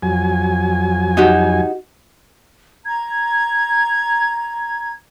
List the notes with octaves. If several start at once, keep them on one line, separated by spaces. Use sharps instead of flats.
F2 F#3 G#5
D#4 F#4 G4
A#5 G#6